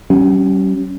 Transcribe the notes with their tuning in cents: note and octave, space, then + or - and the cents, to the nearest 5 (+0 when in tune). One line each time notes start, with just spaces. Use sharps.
G3 -40 C#4 +0